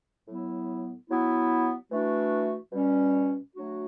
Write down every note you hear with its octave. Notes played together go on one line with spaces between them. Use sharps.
A2 F#3 B3 E4
F#3 B3 E4
E3 A3 D4 F#4
B2 G3 C#4
F#3 A3 D4 F#4